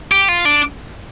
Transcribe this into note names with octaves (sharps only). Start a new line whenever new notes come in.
G4
F4
D4